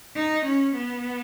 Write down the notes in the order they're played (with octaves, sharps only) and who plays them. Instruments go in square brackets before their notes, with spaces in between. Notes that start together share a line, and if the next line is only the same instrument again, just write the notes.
[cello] D#4
C#4
B3